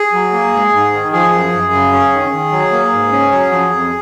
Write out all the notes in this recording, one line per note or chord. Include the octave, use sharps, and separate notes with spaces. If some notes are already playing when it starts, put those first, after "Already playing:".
Already playing: G#4
F#3
A#3
G#2
G#2
D#3
F3 G#4
F#2
F#2
C#3
C#4
D#3
D#3
F#3
A#3
G#2
C#4
F#3
F3
F2